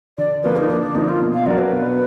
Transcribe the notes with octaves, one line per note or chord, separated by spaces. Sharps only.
D3 D5
F3 A#3 B4
D#4
D3 D4
D4
F3 A#3 D#4
F4
B2
F5
F#3 D4 F#4 A#4 D5
B4
B2